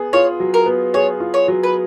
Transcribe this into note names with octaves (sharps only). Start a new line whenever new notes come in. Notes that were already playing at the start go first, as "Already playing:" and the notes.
Already playing: B3 G#4
F4 C#5
F#3
A#4
B3
G#4 C#5
F4
C#5
F#3
B4